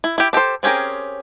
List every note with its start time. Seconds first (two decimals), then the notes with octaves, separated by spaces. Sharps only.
0.04 E4
0.18 E4 G4
0.33 D4 G4 A4 C5
0.63 C4 C#4 G4 G#4 A#4